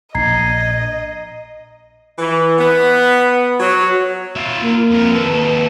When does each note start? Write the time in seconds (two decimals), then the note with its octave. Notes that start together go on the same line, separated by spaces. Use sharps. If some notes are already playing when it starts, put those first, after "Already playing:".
0.15 A#1 A#3 D4 D#5 A#5 G#6 C7
2.19 E3
2.59 B3
3.60 F#3
4.36 F4 E5
4.61 A#3
4.91 F2 A#4
5.13 D#2 A4 B4